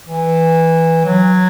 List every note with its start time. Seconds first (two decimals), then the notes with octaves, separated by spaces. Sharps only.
0.08 E3
1.05 F#3